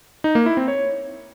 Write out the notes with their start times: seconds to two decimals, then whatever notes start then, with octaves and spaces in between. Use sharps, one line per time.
0.24 D#4
0.35 A#3
0.46 E4
0.57 C4
0.68 C#5